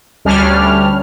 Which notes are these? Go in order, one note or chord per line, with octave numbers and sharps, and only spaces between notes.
D2 G3 C#4 D4 F6